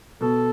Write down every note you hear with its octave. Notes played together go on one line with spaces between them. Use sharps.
B2 A4